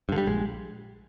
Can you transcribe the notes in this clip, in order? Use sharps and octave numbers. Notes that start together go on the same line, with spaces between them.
G2 D3
G3
A#1 G#3